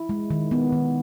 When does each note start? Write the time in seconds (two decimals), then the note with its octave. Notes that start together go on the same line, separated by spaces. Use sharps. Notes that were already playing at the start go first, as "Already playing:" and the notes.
Already playing: E4
0.09 G#3
0.30 D#3
0.51 B3
0.72 D#3